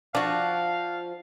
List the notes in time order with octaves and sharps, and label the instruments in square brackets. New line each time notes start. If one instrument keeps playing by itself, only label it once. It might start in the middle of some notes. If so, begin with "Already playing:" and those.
[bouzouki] F3 [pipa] D4 F#4 [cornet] F5